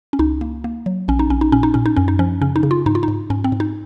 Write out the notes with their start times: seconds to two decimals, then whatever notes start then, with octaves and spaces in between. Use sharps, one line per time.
0.13 C#4
0.19 C#2 D#4
0.41 A#3
0.64 A#3
0.86 F#3
1.08 A#1 C#4
1.19 D#4
1.30 A#1 C#4
1.41 D#4
1.52 A#2 C#4
1.63 D#4
1.74 A#2 C#4
1.86 D#4
1.96 F#2 C#4
2.08 D#4
2.19 F3 C#4
2.41 C#3 C#4
2.56 D#4
2.63 C#3
2.71 F4
2.86 G#2 D#4
2.95 F4
3.03 D#4
3.08 G#2
3.30 G#2 C#4
3.44 C4
3.52 G#2
3.60 D#4